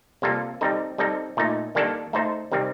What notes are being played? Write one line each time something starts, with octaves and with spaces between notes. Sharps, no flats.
C3 G3 A#3 F4 A4
G3 C4 D#4 A4
G3 C4 D#4 A4
A#2 A3 D#4
D#3 G3 A#3 D4 A4
A3 D#4 A4 C5
C3 D#3 G3 C4